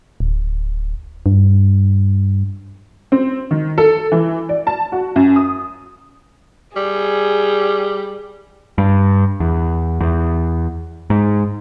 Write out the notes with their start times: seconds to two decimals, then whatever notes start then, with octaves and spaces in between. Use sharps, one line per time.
0.20 D1
1.26 G2
3.12 C4
3.51 D#3
3.78 A4
4.12 E3
4.49 D5
4.67 A5
4.92 F#4
5.16 F#2
5.36 D#6
6.76 G3 G#4
8.78 G2
9.40 E2
10.01 E2
11.10 G#2